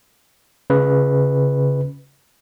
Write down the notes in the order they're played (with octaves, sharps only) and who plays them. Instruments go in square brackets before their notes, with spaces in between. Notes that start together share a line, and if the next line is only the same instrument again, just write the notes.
[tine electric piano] C#3 B4